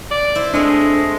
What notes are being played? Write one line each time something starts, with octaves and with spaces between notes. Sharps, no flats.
D5
E4 C5
G#3 A3 C4 D4